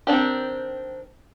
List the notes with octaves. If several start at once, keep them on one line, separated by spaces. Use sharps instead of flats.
D#3 C4 D4 G4